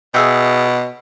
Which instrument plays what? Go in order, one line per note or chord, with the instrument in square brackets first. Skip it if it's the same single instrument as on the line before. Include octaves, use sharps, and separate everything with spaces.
[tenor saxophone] B2 [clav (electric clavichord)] G#4 E5 G5